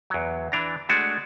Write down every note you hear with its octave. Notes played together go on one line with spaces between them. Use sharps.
E2 F#3
E3 D4 A#5
G#3 A3 D4 F#4